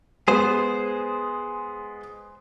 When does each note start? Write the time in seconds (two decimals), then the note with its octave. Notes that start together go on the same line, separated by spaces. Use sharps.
0.28 G#3 B3 G#4 C5